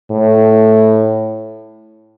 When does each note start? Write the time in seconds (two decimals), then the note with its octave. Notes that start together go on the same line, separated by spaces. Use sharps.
0.11 A2